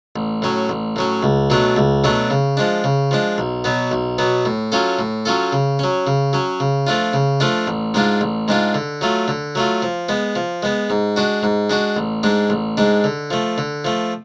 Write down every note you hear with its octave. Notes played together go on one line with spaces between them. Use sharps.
A1
A2 F#3 C#4
A1
A2 F#3 C#4
C#2
B2 F#3 A3 D4
C#2
B2 F#3 A3 D4
C#3
F3 G#3 D4
C#3
F3 G#3 D4
B1
B2 F#3 B3
B1
B2 F#3 B3
A2
F#3 C#4 F4 A4
A2
F#3 C#4 F4 A4
C#3
F#3 C#4
C#3
F#3 C#4
C#3
F3 A3 D4 F4
C#3
F3 A3 D4 F4
A1
G#2 G#3 D4 F4
A1
G#2 G#3 D4 F4
D3
F#3 A3 F4
D3
F#3 A3 F4
F3
G#3 B3
F3
G#3 B3
G#2
G#3 D4 F#4
G#2
G#3 D4 F#4
A1
G#2 G#3 D4
A1
G#2 G#3 D4
D3
F3 A3
D3
F3 A3